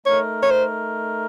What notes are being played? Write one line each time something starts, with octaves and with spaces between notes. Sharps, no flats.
A3 D#4 A#4 C#5
C#5
C5